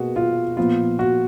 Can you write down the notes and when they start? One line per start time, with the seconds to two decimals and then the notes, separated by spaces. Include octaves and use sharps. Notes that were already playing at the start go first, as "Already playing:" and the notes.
Already playing: B2 A#3 F#4 G#4 B4
0.16 F4
0.57 A#2 F3 B3 F4
0.99 F#4